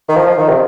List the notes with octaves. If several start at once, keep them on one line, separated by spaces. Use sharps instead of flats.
D#3
F3
F3
D#3
C3